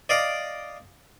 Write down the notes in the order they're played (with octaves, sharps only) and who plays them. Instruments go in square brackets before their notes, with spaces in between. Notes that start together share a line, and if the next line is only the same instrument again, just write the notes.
[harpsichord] D5 D#5 F5 D6